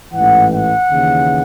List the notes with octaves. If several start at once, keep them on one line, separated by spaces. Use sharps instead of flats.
A1 G#2 E3 F#5
F#5
D#2 C#3 E3